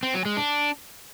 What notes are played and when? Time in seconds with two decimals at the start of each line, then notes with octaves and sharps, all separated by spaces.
0.03 C4
0.14 F#3
0.26 G#3
0.37 D4